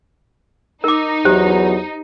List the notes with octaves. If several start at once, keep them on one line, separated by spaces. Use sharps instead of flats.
D#4 A#4 D6
E2 F#3 G4 C5